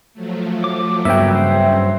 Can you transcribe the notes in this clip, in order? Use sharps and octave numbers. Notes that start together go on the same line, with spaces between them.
F3 F#3 A3
D6
G2 C#3 F#3 A#3 B3 F#4 E5 G5
C5